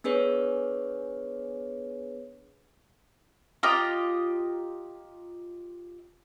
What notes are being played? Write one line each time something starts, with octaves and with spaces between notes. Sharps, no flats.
B3 D4 G#4 B4 C#5
F4 G4 D#5 A#5